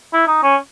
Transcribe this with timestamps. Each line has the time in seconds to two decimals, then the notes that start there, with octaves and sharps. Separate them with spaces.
0.13 E4
0.27 D#4
0.43 C#4